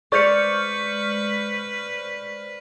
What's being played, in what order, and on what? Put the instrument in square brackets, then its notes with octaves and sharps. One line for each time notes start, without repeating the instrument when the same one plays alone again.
[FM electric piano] G#3 C5 F6 [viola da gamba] B4 [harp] D5 [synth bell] C#6 G6 C#7